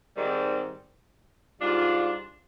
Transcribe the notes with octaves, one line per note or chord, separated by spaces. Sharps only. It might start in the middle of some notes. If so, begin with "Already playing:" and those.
G#2 D#3 G3 C4
G#2 G3 D4 F4